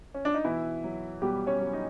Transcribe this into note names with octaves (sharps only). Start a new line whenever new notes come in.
C#4
D4
D#4
B2 E3 E4
F#3
B2 G3 G4
C#4 C#5
F#3
D#4 D#5